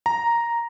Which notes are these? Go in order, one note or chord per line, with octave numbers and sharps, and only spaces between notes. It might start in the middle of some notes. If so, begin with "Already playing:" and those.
A#5